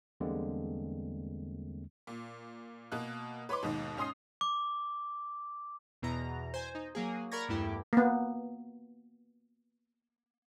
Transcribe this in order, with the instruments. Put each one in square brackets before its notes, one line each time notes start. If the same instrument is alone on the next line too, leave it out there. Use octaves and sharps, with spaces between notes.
[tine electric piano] E2 D3 G3 G#3 A#3 C4
[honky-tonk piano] A#2
B2 A#3 F#6
B4 C#5 B5 C6 D6
D#2 G#2 B2
G#2 C#4 C6 D#6 C7
[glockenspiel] D6
[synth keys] E2 B2 E3 A#5
C5 G#5
D#4
F#3 A#3 G#4
A#4 D5 B5 C#6 G#6 A#6
E2 G2 A3 E4 G4
[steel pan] A#3 B3